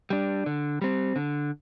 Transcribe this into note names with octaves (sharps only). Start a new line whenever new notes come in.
G3 D4
D3
G3 C4
D3